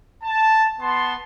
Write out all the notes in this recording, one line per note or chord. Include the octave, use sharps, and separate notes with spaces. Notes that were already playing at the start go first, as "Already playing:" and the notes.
A5
B3 A5 C6